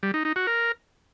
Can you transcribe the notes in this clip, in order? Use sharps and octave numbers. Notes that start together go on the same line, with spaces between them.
G3
D#4
D#4
F#4
A#4